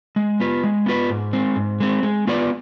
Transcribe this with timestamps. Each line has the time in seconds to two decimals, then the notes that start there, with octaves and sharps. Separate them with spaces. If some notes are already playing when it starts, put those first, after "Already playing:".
0.16 G#3
0.40 B3 F4 B4
0.64 G#3
0.86 B3 F4 B4
1.10 G#2
1.33 G#3 C4
1.56 G#2
1.80 G#3 C4
2.03 G#3
2.27 B3 F4 B4 D5